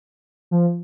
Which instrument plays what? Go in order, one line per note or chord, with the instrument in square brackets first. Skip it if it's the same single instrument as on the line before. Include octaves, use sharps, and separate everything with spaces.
[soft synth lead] F3